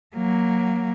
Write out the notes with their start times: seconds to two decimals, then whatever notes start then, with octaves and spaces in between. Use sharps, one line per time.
0.16 F#3 A#3